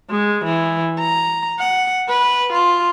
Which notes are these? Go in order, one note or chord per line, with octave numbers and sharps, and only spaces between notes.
G#3
E3
A#5
F#5
B4
F4